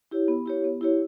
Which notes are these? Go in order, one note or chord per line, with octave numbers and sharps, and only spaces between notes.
E4 G4 C#5
B3
E4 G4 C#5
B3
E4 G4 C#5